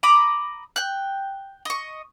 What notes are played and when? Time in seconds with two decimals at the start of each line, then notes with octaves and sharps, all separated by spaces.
0.03 A#5 B5 D6 D#6
0.76 G5 F#6
1.65 D#5 C#6